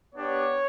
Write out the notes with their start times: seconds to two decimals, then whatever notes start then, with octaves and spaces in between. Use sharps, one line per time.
0.14 B3 D4 G4 C#5